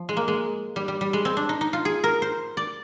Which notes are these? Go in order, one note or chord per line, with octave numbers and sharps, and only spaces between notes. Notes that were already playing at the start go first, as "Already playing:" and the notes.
Already playing: F3
G#3
A#3
G#3
G3
G3
G3
G#3
C4
D4
D#4
D#4
F4
G#4
A#4
C5
D5